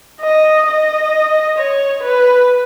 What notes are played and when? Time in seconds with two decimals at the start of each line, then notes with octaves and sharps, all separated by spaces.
0.21 D#5
0.67 D#5
1.57 C#5
2.02 B4